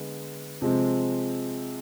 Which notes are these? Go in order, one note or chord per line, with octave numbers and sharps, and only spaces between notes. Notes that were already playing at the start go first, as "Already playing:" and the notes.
Already playing: D3 G#3 B3
C3 F3 G#3 C4